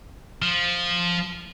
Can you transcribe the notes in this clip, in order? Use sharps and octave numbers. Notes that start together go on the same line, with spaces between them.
F3